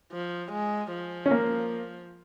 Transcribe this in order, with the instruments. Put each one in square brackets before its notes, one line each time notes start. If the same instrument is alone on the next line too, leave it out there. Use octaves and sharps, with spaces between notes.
[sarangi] F3
G#3
F3
[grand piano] C#4
A#3